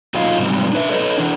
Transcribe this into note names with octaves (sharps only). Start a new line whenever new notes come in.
B2 F#3 D#4 F4 D#5 F5
G#2 C3 F#3 G3 C4
D4 B4 E5
A4 B4 C#5 D#5
E3 D4